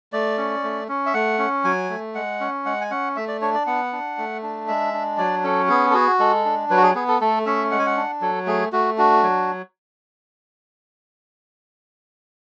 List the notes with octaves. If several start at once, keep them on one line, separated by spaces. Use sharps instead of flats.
A3 D5
C#4
A3
C#4
E5
A3 F#5
C#4
F#3 G#5
A3
G#3 F#5
C#4
G#3 F#5
G#5
C#4 F#5
A3 E5
D5
D4 C#5
D5
B3 F#5
D4
A3
D4
G#3 E5
D4
F#3 D5
C#4 A4
B3 G#4
A4
F#4 G#4
G#3 A4
D4
F#3 B4
F#4
G#4
B3 G#4
A4
A3 A4
C#4 E5
G#3 F#5
G#5
F#5
D4
F#3 A4
A3 G#4
A3 F#4
D4 F#4
F#3